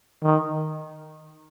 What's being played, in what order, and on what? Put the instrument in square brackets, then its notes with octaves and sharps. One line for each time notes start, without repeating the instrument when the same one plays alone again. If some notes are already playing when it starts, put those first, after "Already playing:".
[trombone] D#3